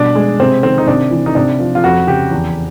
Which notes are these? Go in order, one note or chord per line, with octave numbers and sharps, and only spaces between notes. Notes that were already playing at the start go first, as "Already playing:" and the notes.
Already playing: B2 G3 D4
G#3
C3 C4
D#3 C4
D#4
C3 D4
E3
D#4
C3 D4
F3
F4
F2 F#4
C#3 G4
E2